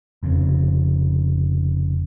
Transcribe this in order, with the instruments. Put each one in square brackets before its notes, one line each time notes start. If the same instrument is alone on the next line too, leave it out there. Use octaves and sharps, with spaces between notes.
[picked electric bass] F1 F2 G#2 C#3